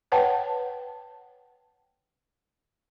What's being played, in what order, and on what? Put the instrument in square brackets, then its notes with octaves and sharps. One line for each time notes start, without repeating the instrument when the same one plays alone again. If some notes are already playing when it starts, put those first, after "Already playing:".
[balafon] B4 C#5 F#5 G5 A5